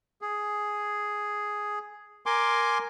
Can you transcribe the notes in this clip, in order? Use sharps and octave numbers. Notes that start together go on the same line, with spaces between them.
G#4
A#4 G#5 C6 D6